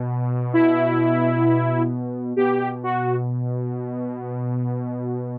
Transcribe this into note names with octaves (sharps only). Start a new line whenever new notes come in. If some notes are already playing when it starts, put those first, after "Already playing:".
Already playing: B2
E4
B2 G4
F#4